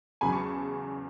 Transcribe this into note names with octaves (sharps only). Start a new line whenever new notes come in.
E2 C#3 F#3 G#5 B5
A5 C#6